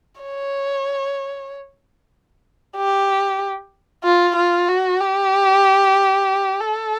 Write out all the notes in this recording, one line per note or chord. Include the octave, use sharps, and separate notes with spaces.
C#5
G4
F4
F4
F#4
G4
A4